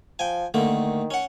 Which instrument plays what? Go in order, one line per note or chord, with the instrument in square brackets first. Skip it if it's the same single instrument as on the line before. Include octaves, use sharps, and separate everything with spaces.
[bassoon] F3 [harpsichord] G5 G#5
[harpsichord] D3 A3 A#3 [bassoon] D#3
[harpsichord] C#4 F#5